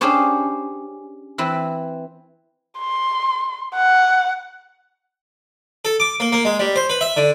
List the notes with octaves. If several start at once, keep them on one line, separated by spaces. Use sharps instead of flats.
C#4 D4 G4 G#4 C5 C#5
E3 C4 B4
C6
F#5
A4
D6
A#3
A#3
G#3
G3
C5
B4
E5
D3